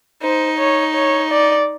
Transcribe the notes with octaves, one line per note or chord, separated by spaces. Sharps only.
D#4 C5
C#5
C#5
D5